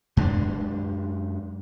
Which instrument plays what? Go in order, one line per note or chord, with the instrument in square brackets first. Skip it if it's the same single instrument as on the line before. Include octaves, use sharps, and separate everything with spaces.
[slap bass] F#2 G#3 C4 D4